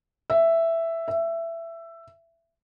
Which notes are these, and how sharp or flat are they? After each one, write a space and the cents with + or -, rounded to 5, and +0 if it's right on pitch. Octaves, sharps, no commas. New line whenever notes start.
E5 +5
E5 +15